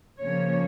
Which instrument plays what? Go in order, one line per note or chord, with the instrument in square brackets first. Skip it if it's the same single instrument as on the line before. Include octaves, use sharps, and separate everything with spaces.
[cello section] C#3 F3 A#3 C#4 C#5